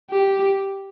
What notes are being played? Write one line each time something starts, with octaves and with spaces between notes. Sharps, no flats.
G4